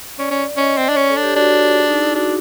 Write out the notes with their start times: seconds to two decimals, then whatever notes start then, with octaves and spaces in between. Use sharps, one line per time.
0.19 C#4 D5
0.31 C#4
0.57 C#4 D#5
0.78 C4
0.89 D4
0.93 C#5
0.97 C#4 D5
1.10 A4
1.17 D4
1.23 G4
1.36 D4 F#4
1.49 F4
1.63 F#4
1.75 G#4
1.89 D#4
2.02 E4
2.15 D4 F#4